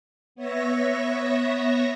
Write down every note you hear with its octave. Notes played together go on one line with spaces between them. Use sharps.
B3 C#5 E5 A#6